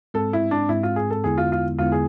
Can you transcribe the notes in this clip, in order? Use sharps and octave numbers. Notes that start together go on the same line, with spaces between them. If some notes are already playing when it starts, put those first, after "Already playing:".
G#2 G#3 C4 A4
E4
D4
G#2 G#3 C4 E4
F4
G#4
A4
E2 D3 G#3 B3 E4 G#4
F4
F4
E2 D3 G#3 B3 E4 F4
G#4